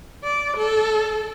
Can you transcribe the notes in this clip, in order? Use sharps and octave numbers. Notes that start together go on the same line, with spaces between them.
D5
A4